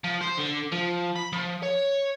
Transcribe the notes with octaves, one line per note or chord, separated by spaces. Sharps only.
F3
C5
D3
F3
B5
F3
C#5